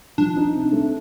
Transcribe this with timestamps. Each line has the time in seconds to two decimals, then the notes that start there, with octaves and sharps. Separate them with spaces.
0.18 F3 D4
0.36 D#4
0.54 C3
0.72 A3